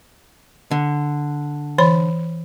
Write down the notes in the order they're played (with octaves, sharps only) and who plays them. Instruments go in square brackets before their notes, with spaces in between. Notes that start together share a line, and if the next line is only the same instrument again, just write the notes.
[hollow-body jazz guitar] D3
[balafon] E3 C#5 B5